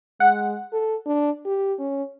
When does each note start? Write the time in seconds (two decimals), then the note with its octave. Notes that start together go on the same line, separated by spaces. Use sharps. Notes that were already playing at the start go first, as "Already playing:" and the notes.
0.20 G#3 F#5
0.73 A4
1.06 D4
1.45 G4
1.79 C#4